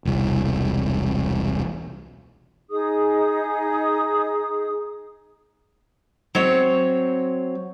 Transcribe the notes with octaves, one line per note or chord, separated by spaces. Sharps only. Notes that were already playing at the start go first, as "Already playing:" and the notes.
E1 C2
D#4 G#4 D#6
F#3 C4 C#5